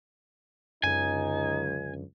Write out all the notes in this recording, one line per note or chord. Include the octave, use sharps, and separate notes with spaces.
C#2 F#2 D3 D#4 G#5